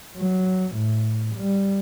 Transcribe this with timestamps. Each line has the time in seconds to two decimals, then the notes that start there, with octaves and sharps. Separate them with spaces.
0.17 F#3
0.76 A2
1.36 G3